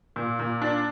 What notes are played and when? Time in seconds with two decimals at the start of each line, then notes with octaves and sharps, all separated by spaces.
0.16 A#2
0.39 A#2
0.62 D4